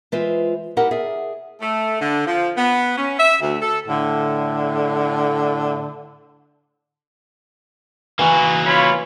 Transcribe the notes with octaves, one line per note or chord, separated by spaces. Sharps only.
E3 G#3 F4 B4 C5 E5
E4 G4 A#4 D#5 F#5
G#4 D5 E5
A3
D3
F3
B3
C#4
E5
D2
A4
A2 D3
E3 A#3 F#4
F4 C#5 B5